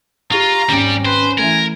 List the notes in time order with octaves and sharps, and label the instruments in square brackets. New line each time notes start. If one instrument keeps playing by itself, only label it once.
[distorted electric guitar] F4 [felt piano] G4 C#6 [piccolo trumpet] A#5
[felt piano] G#1 D#2 G5 [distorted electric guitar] G3 D5 [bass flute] C#4
[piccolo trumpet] B4 [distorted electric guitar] C5
[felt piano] E3 A3 [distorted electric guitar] A#4 [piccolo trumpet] G#5